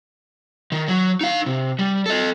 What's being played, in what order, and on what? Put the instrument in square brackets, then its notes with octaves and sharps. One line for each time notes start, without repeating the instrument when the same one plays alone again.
[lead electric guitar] D#3
F#3
D#4 F5
C3
G3
A4 D#5